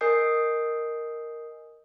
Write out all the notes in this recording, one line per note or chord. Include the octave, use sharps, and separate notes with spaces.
A#4 D#5 G#5 D#6 G6 C7